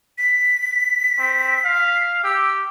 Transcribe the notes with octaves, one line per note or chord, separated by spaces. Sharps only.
B6
C4
F5
G4 E6